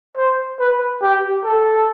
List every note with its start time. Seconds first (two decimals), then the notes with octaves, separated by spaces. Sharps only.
0.17 C5
0.59 B4
1.02 G4
1.44 A4